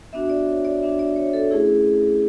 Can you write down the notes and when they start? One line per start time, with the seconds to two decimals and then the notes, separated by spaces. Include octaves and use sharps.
0.13 B3 D4 F#4 E5
0.30 D5
0.47 C#5
0.65 D5
0.82 B3 D4 F#4 E5
0.99 D5
1.16 C#5
1.33 A4
1.51 A3 C#4 E4 G#4